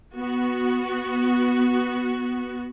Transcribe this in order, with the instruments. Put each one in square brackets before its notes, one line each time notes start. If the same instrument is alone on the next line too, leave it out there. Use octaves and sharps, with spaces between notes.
[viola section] B3 F#4